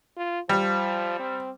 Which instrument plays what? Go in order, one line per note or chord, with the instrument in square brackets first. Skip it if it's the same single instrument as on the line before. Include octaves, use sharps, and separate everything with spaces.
[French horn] F4
[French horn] F3 [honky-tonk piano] G3
[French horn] C4